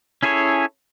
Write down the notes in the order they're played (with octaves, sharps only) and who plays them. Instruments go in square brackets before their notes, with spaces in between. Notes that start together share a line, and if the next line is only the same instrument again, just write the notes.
[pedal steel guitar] C#4 E4 G#4 A4 C#5